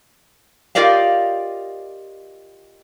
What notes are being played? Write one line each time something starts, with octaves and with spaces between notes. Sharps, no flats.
F4 G4 A#4 D5 D#5 F5